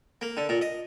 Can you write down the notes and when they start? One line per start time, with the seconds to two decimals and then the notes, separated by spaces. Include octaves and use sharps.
0.21 A#3
0.37 D3
0.49 A#2
0.61 D#5